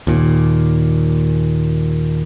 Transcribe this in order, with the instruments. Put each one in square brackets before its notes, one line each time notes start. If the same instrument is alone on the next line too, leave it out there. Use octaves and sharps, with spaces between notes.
[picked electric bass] D#2 A#2